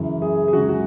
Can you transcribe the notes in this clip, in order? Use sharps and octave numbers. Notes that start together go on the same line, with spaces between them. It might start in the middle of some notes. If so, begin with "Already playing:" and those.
Already playing: F#2 C#3 E3
G#4
G#4
F#2 C#3 G#3 F#4
F#4